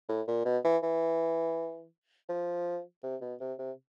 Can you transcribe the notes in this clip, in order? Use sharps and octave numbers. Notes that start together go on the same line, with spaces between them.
A2
A#2
B2
E3
E3
F3
C3
B2
C3
C3